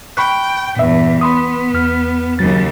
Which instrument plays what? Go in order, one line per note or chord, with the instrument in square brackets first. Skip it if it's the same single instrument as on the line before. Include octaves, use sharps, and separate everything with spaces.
[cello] G5 [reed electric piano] B5 C#6 F#6
[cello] E2 G2 [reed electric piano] A#2 E5
[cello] B3 [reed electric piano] B5 C6 D#6
[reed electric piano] E2 F6
[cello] D#2 C#3 [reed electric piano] F#3 A6